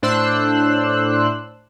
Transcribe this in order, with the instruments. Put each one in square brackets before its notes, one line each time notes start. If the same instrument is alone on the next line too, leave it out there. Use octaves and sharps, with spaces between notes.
[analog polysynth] A2 D4 C5 C6 E6 F#6